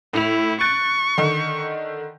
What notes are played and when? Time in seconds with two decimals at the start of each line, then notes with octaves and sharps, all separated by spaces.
0.13 A2 E4 F7
0.61 C#6 F#6 A6 D7
1.18 D3 D#3